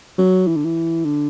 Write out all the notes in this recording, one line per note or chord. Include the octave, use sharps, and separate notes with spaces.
F#3
E3
D3
E3
D3